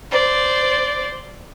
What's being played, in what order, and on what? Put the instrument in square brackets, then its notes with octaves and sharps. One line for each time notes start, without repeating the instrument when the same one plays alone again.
[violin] C5 D5